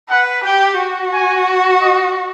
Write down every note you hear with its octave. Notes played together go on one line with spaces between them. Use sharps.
B4 F#5
G4 G5
F#4
G#5
D#5